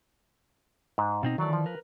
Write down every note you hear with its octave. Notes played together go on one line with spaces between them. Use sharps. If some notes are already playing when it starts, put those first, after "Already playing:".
G#2
B2 C4 D#4
D#3 E3 F#3 A3 D5
F3
A#4 B4